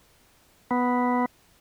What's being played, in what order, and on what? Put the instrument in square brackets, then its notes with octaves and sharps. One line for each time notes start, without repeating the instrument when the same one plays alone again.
[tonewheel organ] B3